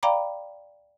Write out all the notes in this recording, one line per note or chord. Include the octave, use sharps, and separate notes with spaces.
D5 F5 G5 A#5 B5 D6